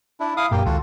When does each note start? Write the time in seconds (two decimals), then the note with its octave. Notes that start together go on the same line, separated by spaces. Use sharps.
0.20 D4 E4
0.37 E4 F5 D#6
0.51 F1 F#2 A#2 A#3 G4
0.65 C#2 D#3 G#3 F4 F#4 A4